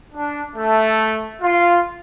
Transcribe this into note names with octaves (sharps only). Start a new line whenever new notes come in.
D4
A3
F4